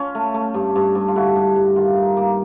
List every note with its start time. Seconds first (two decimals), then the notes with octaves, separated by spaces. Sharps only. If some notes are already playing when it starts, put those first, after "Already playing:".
Already playing: C#4 F4
0.15 A3
0.34 A3
0.54 G2
0.76 G2
0.95 G2
1.08 F4
1.16 D3 E4 F#4
1.36 G2
1.56 G2
1.76 D#3 F4
1.97 D#4
2.17 A#3